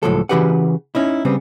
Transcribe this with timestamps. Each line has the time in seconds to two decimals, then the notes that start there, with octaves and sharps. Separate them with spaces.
0.03 C#2 A2 F3 F#3 A4
0.29 C#3 E3 F#4 G4 B4 F#5
0.95 C#4 D#4 E4
1.25 C#3 G3 B3 C4